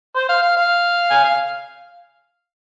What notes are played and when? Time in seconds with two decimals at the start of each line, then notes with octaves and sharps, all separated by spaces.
0.16 C5
0.29 F5
0.43 F5
0.57 F5
1.10 G#5
1.24 F5